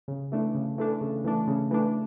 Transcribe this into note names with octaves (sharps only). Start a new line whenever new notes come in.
C#3
E3 A3 D4
C#3
E3 A3 D4
C#3
E3 A3 D4
C#3
E3 A3 D4